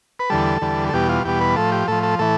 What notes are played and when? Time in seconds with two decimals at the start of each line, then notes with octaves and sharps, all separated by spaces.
0.19 B4
0.30 E2 D3 G3 A4
0.62 E2 D3 G3
0.89 A4
0.93 E2 B2 G3 G4
1.09 F4
1.24 E2 B2 G3 G4
1.41 B4
1.56 A2 F3 A4
1.72 G4
1.88 A2 F3 A4
2.03 A4
2.19 A2 E3 A4